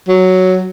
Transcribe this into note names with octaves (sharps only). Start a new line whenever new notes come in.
F#3